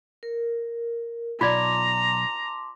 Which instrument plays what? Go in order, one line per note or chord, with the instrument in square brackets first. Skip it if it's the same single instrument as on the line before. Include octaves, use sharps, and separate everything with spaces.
[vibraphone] A#4
[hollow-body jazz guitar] B1 [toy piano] F4 D5 [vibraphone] A5 C6 D6 [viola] A#5